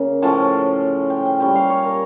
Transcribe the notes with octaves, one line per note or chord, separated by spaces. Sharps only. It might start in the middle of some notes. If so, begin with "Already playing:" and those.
Already playing: C#3 A#3
A2 F3 C#4 A5
G5
G5
A#2 G3 C#4 G5
F5
C#5
A#4